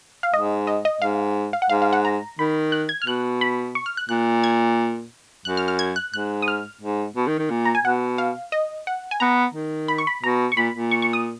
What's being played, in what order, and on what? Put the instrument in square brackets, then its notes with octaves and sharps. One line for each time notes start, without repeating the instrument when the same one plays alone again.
[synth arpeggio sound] F5
[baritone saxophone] G#2 [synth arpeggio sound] D#5
[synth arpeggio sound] D#5
D#5
[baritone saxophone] G#2 [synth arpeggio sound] F5
[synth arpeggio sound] F5
F#5
[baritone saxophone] G#2 [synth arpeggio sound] F5
[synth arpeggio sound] F5
F#5
A#5
[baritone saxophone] D#3 [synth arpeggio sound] B5
[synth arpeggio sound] F#6
G#6
F6
[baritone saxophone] B2 [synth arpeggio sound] F#6
[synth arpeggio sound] B5
C#6
F6
F#6
[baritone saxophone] A#2 [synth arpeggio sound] F#6
[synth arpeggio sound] G#6
[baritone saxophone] F#2 [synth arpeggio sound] F#6
[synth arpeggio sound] F6
F6
G#6
F#6
[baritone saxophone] G#2 [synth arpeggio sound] F#6
[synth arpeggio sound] D#6
F6
[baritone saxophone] G#2
B2
D#3
D#3
A#2
[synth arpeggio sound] A#5
G#5
[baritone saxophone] B2 [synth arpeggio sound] F#5
[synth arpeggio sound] F5
D#5
F#5
G#5
[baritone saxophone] B3 [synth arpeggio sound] A#5
[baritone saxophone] D#3
[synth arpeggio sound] B5
C#6
B5
[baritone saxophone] B2 [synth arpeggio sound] A#5
[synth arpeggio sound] C#6
[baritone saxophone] A#2 [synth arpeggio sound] B5
[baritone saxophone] A#2
[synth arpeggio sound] C#6
C#6
D#6